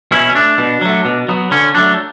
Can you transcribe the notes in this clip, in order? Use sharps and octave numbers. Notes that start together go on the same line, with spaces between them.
B2 C#4 E4
C#4
A3 D4
B2
F#3 A3
B2
F#3 B3
D3 C#4
F#3 A3 D4